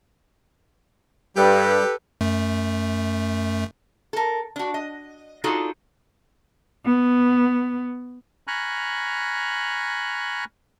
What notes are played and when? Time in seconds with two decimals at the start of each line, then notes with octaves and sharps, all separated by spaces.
1.37 G2 G3 G4 A4 B4
2.21 F#2 A3
4.13 A4 A#4
4.56 D4 F#4
4.74 D#5
5.44 D4 D#4 F4 F#4 G#4 A4
6.85 B3
8.47 G#5 A#5 B5 C#6 F6 F#6